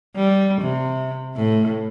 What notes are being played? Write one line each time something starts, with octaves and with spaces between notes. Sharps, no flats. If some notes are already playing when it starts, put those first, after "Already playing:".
G3
C3
A2